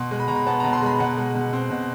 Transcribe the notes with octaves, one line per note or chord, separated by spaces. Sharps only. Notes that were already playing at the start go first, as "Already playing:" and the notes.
Already playing: B2 C6
G#3
B5
B2 A#5
B5
B3 A5
B2 A#5
C6
G#3 B5
B2 F#5
G#3
B2
C4
B2